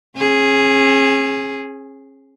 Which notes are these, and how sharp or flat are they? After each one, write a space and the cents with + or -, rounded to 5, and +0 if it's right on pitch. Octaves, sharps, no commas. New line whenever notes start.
C#4 -40 G#4 +0